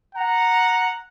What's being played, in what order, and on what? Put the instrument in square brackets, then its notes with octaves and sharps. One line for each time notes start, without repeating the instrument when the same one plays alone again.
[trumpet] F#5 [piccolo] A#5